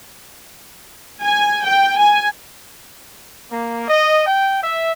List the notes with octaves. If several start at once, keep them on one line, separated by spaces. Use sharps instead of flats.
G#5
G5
G#5
A#3
D#5
G5
E5